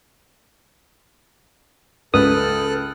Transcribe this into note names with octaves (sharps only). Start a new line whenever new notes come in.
C#2 A4 B4 D#6 F6 F#6